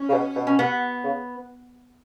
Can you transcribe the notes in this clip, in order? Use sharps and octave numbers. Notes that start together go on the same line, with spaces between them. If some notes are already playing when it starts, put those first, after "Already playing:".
Already playing: C#4
C#3
B2
B2
C#4
B3
C#3